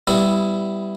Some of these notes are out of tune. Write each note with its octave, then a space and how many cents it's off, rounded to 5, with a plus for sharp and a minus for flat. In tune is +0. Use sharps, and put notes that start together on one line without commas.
G3 +0 B3 +30 E4 +0